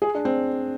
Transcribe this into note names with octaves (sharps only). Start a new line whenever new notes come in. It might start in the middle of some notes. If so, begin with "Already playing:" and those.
G#4
D4
C4